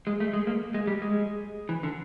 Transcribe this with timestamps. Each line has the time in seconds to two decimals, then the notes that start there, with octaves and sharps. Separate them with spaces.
0.07 G#3
0.20 A3
0.33 G#3
0.47 A#3
0.74 G#3
0.87 G3
1.02 G#3
1.69 E3
1.83 D3